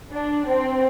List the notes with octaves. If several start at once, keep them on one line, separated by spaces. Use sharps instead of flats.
D4
C4